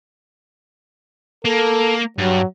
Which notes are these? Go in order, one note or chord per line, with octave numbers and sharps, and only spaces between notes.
A#3 A4
G2 F#3